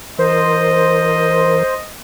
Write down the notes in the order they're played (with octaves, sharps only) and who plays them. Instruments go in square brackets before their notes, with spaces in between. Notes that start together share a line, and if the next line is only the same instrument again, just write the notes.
[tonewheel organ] E3 A#4 [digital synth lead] C5 [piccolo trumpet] D#5